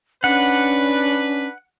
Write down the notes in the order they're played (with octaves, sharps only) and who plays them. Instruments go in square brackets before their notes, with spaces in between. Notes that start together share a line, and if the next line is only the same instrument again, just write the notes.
[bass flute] C#4 [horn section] D4 B4 [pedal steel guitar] F#5